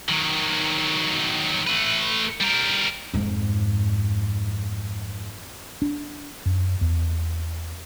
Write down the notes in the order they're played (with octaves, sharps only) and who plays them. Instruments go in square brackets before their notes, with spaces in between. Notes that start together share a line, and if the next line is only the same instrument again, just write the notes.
[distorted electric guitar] D#3 F#3
A3 B4
G3 A#4
[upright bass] F2 G#2
[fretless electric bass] D4
F#2
E2